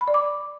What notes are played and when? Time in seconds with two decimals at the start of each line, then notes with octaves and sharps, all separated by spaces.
0.01 B5
0.08 D5
0.14 D6